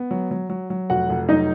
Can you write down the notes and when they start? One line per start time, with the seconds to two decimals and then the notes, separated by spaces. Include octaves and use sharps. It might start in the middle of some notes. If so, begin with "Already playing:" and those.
Already playing: B3
0.11 F#3
0.31 F#3
0.49 F#3
0.70 F#3
0.90 F1 F#4 F#5
1.10 F1
1.29 F#3 D#4 D#5